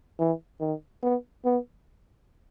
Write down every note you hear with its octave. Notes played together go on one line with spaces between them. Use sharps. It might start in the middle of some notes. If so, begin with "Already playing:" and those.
E3
D#3
B3
B3